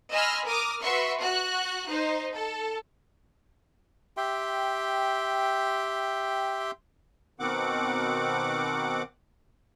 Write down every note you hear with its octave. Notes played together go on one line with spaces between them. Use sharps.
D#5 G#5 B5 C6 E6 F6
A#4 D6 D#6 F6
F#4 B4 E5 C6 C#6
F#4 F#6
D#4 C5
A4
G4 E5 G5 C6
B2 D#3 C4 F#5 D6